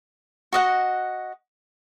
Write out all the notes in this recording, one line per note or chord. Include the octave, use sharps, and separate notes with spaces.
F#4 D#5 F#5